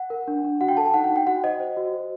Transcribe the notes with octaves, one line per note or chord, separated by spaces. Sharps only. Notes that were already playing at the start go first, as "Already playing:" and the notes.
Already playing: F#5
A#4
D4
D4
F#4 F#5
G5
A4 A5
G5
D#4 F#5
F#5
D#4
G5
F#4 F#5
C5 D#5
C5
F#4
C5